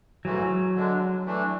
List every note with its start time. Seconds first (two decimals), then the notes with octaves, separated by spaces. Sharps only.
0.25 G#2 E3 F#3 A3
0.75 D3 G#3 D4
1.25 E3 A3 D4